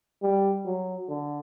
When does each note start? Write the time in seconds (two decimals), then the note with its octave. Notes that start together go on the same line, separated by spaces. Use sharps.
0.22 G3
0.66 F#3
1.09 D3